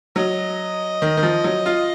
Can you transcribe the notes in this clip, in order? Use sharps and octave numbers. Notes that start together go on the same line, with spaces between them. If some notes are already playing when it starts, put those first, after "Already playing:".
F#3 D#5
D#3
D#3
F3
F#3
F4